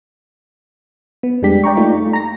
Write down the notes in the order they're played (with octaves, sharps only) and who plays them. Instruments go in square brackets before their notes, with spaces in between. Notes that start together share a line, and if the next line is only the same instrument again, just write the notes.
[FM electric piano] B3
F2 G3 G#3 D4 G4 B6
D5 G5 A#5 C#6
A3 A#3 D#4 F4
A3
A#5 A#6